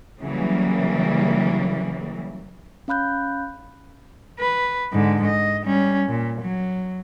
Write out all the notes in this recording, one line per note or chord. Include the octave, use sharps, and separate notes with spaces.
C#3 E3 F#3 G3 A#3
C#4 F5 B5 F#6 G6
B4
G#2 D3
D#5
G3 C#4
A#2
F#3